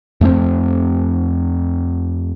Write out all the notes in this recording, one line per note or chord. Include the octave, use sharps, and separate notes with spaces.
F2 A3 B3 C4